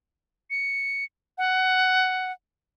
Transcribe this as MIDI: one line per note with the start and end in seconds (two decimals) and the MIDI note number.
0.50 1.04 97
1.38 2.32 78